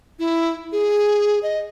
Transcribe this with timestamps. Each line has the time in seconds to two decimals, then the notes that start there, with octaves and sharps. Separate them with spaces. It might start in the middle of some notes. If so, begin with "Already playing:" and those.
0.19 E4
0.72 G#4
1.43 D#5